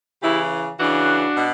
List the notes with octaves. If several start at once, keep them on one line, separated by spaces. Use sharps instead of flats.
C#3 E3 E4 G4
C#3 E3 D4 F#4
B2